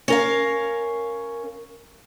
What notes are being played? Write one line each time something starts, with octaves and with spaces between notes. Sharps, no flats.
C#4 A#4 F5